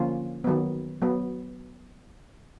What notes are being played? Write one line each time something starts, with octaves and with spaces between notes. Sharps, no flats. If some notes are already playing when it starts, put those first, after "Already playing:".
Already playing: D3 F3 A#3 C#4 F4
D#3 F#3 B3
F#3 B3